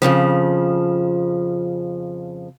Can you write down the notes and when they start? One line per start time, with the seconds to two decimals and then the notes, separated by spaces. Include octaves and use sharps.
0.02 F2 A2 C#3 F3